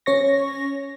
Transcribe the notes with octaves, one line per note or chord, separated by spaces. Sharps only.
C#4 C#5 C#6 A#6